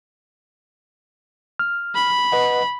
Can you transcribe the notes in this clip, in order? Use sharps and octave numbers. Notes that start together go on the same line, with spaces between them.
F6
B5
B4 D#5 F#5